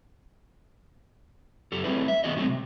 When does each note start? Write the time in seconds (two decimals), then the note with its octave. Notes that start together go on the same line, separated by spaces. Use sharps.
1.72 F#2 G4 A4
1.84 G3 A3 C4 E4 G#4 B4
2.08 E5
2.24 D#3 B3 C#4 F#4 G#4 D#5
2.36 D3 F#3 G#3 A3 C4
2.49 C3